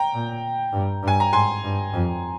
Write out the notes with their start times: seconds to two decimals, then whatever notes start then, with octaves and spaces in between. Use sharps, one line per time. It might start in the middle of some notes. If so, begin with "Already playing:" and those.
Already playing: G5 A#5
0.14 A#2
0.73 G2
1.03 G2
1.08 G#5
1.20 A#5
1.32 G#2 G#5 C6
1.64 G2
1.93 F2